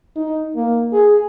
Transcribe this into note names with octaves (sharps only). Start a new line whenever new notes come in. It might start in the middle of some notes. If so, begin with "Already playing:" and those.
D#4
A#3
G#4